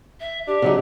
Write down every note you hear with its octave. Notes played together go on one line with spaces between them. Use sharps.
E5
D4 G4
C#3 F#3 D#4